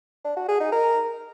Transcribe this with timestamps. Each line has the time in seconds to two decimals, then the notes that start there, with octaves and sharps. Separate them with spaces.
0.25 D4
0.37 F#4
0.48 G#4
0.60 D#4
0.72 A#4